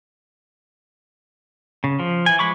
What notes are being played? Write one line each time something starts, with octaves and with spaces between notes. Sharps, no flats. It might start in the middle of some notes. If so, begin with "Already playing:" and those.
C#3
F3
E3 G#5
F3 G#3 B5 C#6 D6